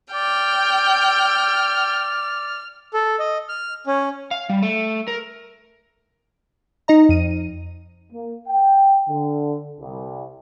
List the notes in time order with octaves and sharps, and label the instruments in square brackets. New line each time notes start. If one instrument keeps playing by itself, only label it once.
[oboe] D5 [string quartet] G5 [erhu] F6
[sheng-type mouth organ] A4
D#5
F6
C#4
[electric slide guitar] F5
G3
A3
A#4
[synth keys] D#4 D#5 A#5
F2 D#7
[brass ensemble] A#3
G5
D3
C2